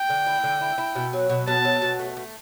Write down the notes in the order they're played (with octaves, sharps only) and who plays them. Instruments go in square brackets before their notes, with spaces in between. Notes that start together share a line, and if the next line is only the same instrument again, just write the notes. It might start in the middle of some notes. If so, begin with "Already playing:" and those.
Already playing: [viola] G5
[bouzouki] D3
E4
D3
E4
E4
B2
F#3
B2
[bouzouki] B2 [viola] A5
[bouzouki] F#3
B2
A3
A3